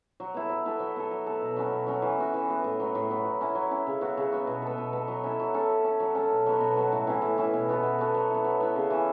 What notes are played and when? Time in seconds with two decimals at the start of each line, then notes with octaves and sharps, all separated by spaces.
0.20 F#3
0.34 B3 E4 A4
0.49 F#3
0.66 B3 E4 A4
0.80 F#3
0.96 B3 A4
1.11 F#3
1.26 B3 A4
1.42 B2
1.57 F#3 C#4
1.72 B2
1.87 F#3 C#4
2.02 E3
2.18 B3 F#4
2.34 E3
2.49 B3 F#4
2.64 A2
2.80 F#3 B3
2.95 A2
3.10 F#3 B3
3.25 F#3
3.41 C#4 E4
3.55 F#3
3.71 C#4 E4
3.87 C#3
4.01 F#3 B3 F#4
4.17 C#3
4.32 F#3 B3 F#4
4.47 B2
4.62 B3 A4
4.78 B2
4.93 B3 A4
5.08 F#3
5.23 C#4 E4 A4
5.39 F#3
5.54 C#4 E4 A4
5.69 F#3
5.84 C#4 A4
6.00 F#3
6.15 C#4 A4
6.31 B2
6.46 F#3 B3 F#4
6.61 B2
6.76 F#3 B3 F#4
6.92 A2
7.07 E3 C#4 E4
7.22 A2
7.38 E3 C#4 E4
7.54 B2
7.69 B3 F#4 A4
7.83 B2
7.99 B3 F#4 A4
8.14 F#3
8.30 B3 E4
8.45 F#3
8.60 B3 E4
8.76 C#3
8.90 E3 C#4